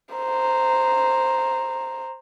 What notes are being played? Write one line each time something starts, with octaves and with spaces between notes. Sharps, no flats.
C5 A#5